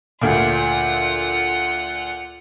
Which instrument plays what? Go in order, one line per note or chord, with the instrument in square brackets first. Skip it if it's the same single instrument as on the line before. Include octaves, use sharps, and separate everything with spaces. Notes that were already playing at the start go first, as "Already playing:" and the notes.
[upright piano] D2 A#2 [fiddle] F4 F#5